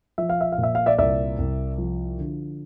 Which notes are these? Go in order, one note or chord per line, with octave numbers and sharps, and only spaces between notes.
F3 E5
F5
E5
F5
A#2
E5
F5
D5 E5
C2 D5 E5
C2
F3
D3